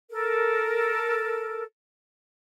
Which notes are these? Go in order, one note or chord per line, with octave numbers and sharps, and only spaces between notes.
A4 A#4